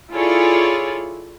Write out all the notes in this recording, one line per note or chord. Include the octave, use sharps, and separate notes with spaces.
E4 F4 G#4 A4 C#5 D5